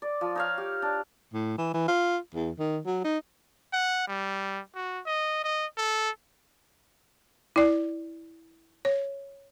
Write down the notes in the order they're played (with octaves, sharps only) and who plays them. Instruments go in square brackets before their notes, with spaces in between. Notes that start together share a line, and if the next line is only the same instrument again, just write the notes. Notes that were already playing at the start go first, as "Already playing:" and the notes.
[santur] D5
F3
D#4 C#5 F5
G4
D4
[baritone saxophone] A2
E3
E3
F4
E2
D#3
F#3
D#4
[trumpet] F#5
G3
F#4
D#5
D#5
A4
[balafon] E4 D5
C#5